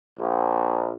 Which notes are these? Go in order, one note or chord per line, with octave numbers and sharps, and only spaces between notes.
A#1